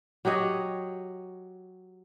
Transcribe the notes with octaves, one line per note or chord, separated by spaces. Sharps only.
F#3 G4 C#5 D#5